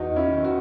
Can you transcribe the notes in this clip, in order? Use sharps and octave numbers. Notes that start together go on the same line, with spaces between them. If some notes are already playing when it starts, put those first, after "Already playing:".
Already playing: E2 D#4 F#4
C#4 E4
D#3
D#4 F#4